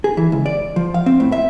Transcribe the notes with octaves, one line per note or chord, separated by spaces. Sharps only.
G#4
E3
C#2
D5
F3
F5
C4
A2
E5